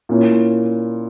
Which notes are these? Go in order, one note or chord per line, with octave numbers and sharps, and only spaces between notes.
A#2 A#3 C#4 E4